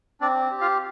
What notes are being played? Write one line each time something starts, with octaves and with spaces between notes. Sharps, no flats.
C4 D4 D5
G4
F4 F5